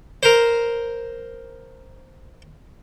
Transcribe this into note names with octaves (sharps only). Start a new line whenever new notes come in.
A#4 C5